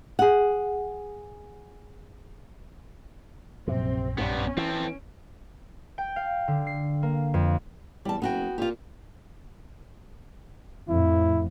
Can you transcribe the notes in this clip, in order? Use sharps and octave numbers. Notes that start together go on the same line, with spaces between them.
G#4 F#5
A#1 F#2 C3 C4
G2 C3 B3 C#4
E3 C4 A4
G5
F5
D3
C7
A#3
F2
E2 G3 A5
F#1 B3 F#4 G5
A#2 F4 G4
F2 A2 E4